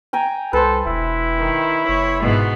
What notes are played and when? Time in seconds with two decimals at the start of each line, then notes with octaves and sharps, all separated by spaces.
0.13 G5 G#5 A#5
0.53 C2 A4 B4 C5
0.86 E1 E4
1.38 D#3
1.88 F#1 C#5
2.20 G#2 B2 B3